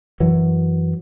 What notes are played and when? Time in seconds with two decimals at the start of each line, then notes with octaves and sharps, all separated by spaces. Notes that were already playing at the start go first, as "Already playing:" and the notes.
0.20 F#2 E3 F#3